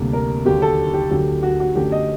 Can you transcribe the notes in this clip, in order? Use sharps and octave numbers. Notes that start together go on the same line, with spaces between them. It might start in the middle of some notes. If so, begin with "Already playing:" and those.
Already playing: D2 C3 G3 A#3
A#4
D#2 D3 F#3 G4
A4
G4
D2 D3 F#3 G4
F#4
F#4
F#2 D3 F#3 A3 G4
D#5